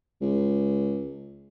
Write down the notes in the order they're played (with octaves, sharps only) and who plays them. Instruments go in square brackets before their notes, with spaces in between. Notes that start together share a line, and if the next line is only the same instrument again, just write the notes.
[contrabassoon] C#2